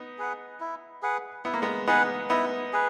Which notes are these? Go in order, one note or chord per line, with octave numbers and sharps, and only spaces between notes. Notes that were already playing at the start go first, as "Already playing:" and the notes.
Already playing: B3 D#4
G#4 B4 F#5
E4
G#4 B4 F#5
B3 E4
A#3
G#3 B3
B3 D#4 G#4 B4 F#5
B3 D#4 E4
G#4 B4